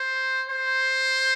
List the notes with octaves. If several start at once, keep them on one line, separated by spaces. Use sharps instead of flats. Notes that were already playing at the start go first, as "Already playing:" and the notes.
Already playing: C5
C5